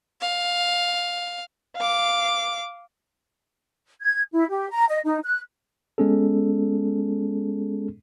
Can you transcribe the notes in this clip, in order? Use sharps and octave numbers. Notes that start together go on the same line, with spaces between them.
F5
F5 D6
G#6
E4
G4
A#5
D#5
D#4
F#6
G#3 B3 C#4 G#4 A4